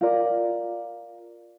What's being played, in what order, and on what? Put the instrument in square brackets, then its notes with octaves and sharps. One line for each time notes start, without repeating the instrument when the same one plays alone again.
[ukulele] F4 A#4 D5